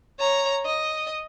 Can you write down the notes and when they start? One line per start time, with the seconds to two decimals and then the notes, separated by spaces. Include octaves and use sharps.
0.20 C#5 A#5
0.65 D#5